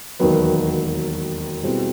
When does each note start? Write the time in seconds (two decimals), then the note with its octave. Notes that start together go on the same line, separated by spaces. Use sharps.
0.19 E1 D#2 D#3 F#3 B3
1.63 B2 G3 C4 E4 G#4